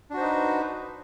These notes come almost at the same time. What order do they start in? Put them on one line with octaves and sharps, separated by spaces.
D4 F#4 C5 D#4 B4